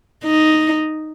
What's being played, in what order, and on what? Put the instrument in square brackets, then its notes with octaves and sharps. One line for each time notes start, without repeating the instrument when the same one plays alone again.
[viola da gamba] D#4